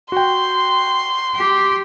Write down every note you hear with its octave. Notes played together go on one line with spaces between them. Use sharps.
F#4 G5 C6
G4